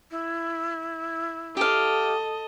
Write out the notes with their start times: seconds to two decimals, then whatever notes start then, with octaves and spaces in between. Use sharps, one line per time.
0.11 E4
1.57 G4 A4 D#5 F5